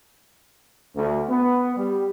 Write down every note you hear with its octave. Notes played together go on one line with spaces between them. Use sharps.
D2
B3
G3